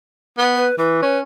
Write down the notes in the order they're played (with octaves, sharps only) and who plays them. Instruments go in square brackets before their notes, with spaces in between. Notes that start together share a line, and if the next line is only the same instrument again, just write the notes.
[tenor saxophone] B3
[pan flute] B4
[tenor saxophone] E3 [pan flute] B4
[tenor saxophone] C#4